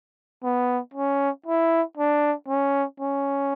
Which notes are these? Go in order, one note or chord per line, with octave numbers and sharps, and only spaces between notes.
B3
C#4
E4
D4
C#4
C#4